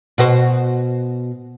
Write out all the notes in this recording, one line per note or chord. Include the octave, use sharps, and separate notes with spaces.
B2 F#4 C5